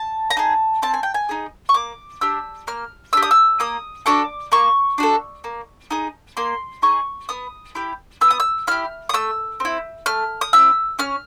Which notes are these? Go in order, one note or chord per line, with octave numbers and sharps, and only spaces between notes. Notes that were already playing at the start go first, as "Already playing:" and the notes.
Already playing: A5
A#5
D#4 G#4 A5
C4 A5
G#5
G5
G#5
D#4 G#4
C#6
A#3 D6
D4 G4 E6
A#3 F6
D4 G4 E6
D#6
E6
A#3 D#6
D4 F#4 A4 D6
A#3 C#6
D4 F#4 A4
A#3
D#4 G#4
A#3 C6
D#4 G#4 C#6
B3 D#6
E4 G4
B3 E6
D#6
E6
E4 G4 F6
D#6
A3 E6
C4 E4
A3 F6
D#6
C4 E4 E6
C#4 F6